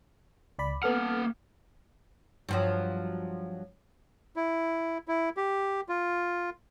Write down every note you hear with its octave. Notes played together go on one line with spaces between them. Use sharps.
C#2 D5 B5
A#3 B3 A4 F#5 F6
G2 F3 F#3
E4
E4
G4
F4